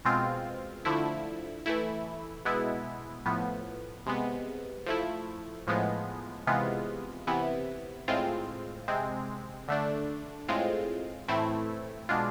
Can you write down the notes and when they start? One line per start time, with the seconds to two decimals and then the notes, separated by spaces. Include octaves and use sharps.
0.05 B2 G#3 C4 F4
0.85 D3 F3 A3 E4
1.66 E3 A3 E4
2.45 B2 G#3 B3 E4
3.26 A2 F3 B3
4.06 C3 G#3 B3
4.86 F3 A3 E4
5.67 A2 F3 G#3 B3
6.47 C3 E3 G#3 B3 F4
7.27 C3 E3 B3 E4
8.08 A2 G#3 C4 F4
8.88 C3 G#3 C4
9.68 D3 A3 D4
10.48 A2 G#3 C4 F4
11.28 A2 E3 A3 C4 E4
12.09 B2 G#3 D4 F4